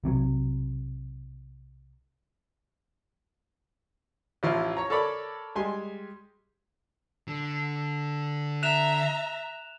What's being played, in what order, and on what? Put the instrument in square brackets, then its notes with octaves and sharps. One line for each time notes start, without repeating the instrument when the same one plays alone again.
[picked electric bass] B1 C3 D#3 F#3
[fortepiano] A1 F3 E4 F4 C6 F6
C#5 A#5
A4 A#4 C#5 D5 B5 D6
G3 G#3 G#5 C6
[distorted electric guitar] D3
[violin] E5 A#5 [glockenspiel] F#6 E7 F7